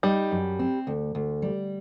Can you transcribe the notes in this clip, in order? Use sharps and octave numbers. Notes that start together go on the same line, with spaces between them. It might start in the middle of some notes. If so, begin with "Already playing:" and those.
G3 D#4
F#2
C4
D2
D2
G3